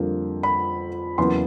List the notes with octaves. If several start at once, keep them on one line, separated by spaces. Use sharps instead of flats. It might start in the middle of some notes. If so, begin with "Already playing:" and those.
Already playing: F2 D3 G3 A#3
B5
E2 C#3 F#3 A#3 C6